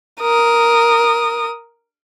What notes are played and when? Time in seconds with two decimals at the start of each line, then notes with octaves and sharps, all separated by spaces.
0.21 A#4 D#6